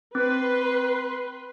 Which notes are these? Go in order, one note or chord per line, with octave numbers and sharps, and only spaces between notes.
C4 B4 C6